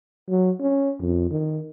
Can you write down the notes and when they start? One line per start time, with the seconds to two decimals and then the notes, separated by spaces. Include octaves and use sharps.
0.29 F#3
0.61 C#4
1.00 F2
1.31 D#3